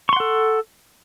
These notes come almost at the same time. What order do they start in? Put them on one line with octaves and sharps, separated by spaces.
C#6 C6 F#5 A4